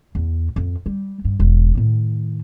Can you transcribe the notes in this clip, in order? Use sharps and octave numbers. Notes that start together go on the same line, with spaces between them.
E2
F2
G3
G2
E1
A2 D#3